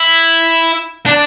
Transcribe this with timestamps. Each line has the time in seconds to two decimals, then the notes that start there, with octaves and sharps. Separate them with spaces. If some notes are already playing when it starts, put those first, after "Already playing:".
Already playing: E4
1.06 D4